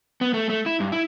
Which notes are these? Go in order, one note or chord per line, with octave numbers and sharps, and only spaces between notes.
B3
A3
A3
E4
G2
E4